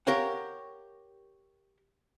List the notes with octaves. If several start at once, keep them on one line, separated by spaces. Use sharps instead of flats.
G4 A#4 C#5 F5 F#5